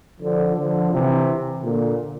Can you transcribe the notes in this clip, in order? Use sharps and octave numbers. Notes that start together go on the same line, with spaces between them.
D3 F3
D3 F3
C3 E3
A#2 D3